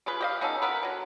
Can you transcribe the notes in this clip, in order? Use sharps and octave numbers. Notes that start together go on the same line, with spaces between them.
C#3 F4 G#4 B4
G4 D#5 F5
B3 C#4 D#4 A4
B3 A#4 B4
D3 F#3